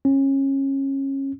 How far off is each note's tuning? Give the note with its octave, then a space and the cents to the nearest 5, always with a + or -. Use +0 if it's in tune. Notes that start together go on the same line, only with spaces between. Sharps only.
C#4 -25